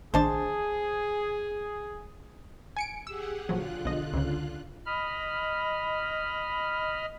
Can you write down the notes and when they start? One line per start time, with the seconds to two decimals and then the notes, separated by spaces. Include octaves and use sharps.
0.14 A1 D#3 D4 G#4 C5 A5
2.76 G#5 C#7 D7
3.07 G4 G#4 F#5 E6
3.49 A#1 D3 F3 F#3 F4 F#6
3.85 B1 F3 D#5
4.14 C#2 G#2 C#3
4.86 D#5 B5 F6